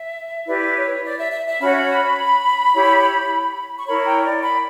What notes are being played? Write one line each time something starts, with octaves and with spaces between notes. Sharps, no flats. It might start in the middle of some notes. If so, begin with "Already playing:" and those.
Already playing: E5
E4 G4 B4 D5
C#5
D5
E5
E5
E5
C#4 F#4 C#5 B5
E4 G4 C#5
C#6
E4 A#4 C#5 B5
G5
D5
B5